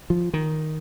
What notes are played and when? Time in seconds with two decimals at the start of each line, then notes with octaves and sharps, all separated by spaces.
0.10 F3
0.34 D#3